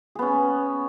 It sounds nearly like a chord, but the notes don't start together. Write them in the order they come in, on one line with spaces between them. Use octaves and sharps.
G#4 B3 C#4